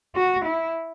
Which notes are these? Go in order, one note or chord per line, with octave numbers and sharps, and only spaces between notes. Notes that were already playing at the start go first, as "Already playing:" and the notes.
F#4
E4